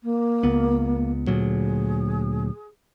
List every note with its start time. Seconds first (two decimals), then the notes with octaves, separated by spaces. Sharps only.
0.03 A#3
0.43 C#2 B3
1.27 D2 A#2 F#3 G#4